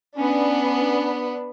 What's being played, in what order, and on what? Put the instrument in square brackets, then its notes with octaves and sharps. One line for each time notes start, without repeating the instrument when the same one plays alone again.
[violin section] B3 D4 B4 [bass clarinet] C#4